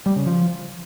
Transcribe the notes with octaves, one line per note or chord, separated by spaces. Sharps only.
G3
C#3
F3